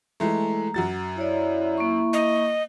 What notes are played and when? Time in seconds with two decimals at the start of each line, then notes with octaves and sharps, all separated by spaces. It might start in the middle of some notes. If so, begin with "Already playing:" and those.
0.20 E3 G#3 A3 A#5
0.74 F#2 F#4 A6
1.18 E4 C#5 D5
1.78 A#3 C#6
2.13 D#5